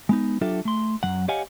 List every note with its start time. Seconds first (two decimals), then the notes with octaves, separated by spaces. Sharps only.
0.09 G#3 B3 D#4
0.41 F#3 D4 F4 G4 A4 E5
0.65 A3 C6
1.03 F#2 F#3 F#5
1.28 G4 C#5 D#5 F5 F#5 G#5